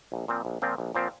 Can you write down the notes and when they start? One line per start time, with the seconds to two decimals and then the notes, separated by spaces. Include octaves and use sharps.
0.12 A#1
0.28 A#2 F3 C4
0.45 A#1
0.62 A#2 F3 C4
0.78 A#1
0.95 A#2 F3 C4